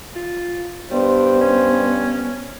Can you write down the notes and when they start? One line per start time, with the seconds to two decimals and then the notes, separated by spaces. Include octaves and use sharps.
0.16 F4
0.91 G2 G3 B3 C5
1.41 C#4